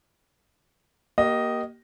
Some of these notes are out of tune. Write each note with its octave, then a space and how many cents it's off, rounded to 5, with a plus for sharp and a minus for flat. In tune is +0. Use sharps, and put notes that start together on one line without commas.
A#3 +15 G4 -25 D#5 +0